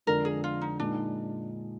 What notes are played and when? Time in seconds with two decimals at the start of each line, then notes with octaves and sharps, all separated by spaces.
0.07 F2 D3 F3 G#3 A#4
0.25 G#4
0.44 F4
0.61 D#4
0.80 A#2 G#3 D4 D#4